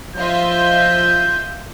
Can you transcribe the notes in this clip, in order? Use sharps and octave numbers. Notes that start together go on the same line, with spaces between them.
F3 F4 D#5 E5 G6